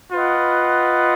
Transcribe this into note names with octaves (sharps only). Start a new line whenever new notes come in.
F4 B4 D#5 F#5